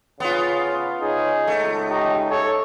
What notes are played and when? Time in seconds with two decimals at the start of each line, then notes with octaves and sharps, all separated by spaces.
0.20 C#3 B3 F4
1.01 C#3 D#4 G#4
1.47 C#2 A3
1.89 D#4 G4
2.30 A4 C#5